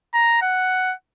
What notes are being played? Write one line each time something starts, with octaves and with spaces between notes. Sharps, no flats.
A#5
F#5